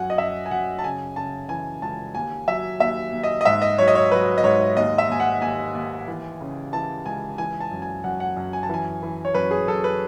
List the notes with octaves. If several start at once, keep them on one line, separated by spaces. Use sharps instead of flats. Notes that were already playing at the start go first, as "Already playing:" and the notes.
Already playing: F#2 F#3 F#5 G#5
D#5
F#2 E5
G#5
F#2 F#5
A5
C#3 G#5
C#3 A5
E3 G#5
C#2 A5
D#2 G#5
F#3 E5
D#2 E5
D#2
D#5
D#5
G#2 E5
D#5
F#3 C#5
D#5
C#5
F#3 B4
D#5
G#2 C#5
D#2 D#5
E5
D#2 G#5
F#5
D#2 G#5
D#2
E3
C#3
E3 A5
C#2 G#5
E3 G#5
A5
F#2
G#5
F#2 F#5
F#5
F#2
G#5
A5
E3 G#5
E3
C#5
F#2 B4
G#4
F#2 A4
B4